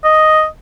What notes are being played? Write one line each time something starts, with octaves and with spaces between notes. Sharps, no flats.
D#5